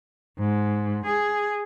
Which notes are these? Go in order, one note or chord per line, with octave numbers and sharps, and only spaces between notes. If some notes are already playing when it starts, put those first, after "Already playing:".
G#2
G#4